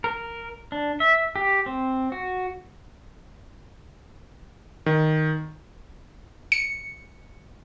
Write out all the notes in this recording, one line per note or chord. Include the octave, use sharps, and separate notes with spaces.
A#4
D4
E5
G4
C4
F#4
D#3
C#7